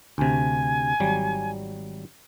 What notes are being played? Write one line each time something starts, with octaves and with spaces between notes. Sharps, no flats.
D2 C3 G#5
G#1 F#3 G3